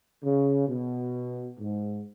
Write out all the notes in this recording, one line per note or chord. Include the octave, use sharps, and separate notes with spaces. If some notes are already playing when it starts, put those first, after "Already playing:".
C#3
B2
G#2